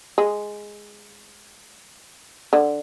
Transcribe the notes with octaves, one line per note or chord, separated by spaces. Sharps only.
G#3
D3